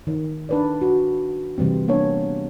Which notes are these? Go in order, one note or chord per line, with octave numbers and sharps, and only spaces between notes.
D#3
D4 B4 D5
F#4
C3 E3 G3 C4
A#3 B3 D4 C#5